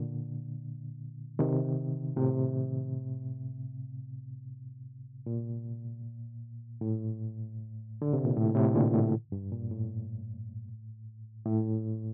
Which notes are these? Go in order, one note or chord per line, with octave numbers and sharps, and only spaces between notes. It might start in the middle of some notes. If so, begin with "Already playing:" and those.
Already playing: A#2 D3
C3 D#3
A2 C3
A#2
A2
D3
C3
A#2
A2
A2 C3
A#2 D3
A2
G2
A#2
A2
A2